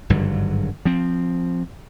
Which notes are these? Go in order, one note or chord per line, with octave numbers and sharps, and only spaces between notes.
G#1 G2 D3 F#3
F3 C4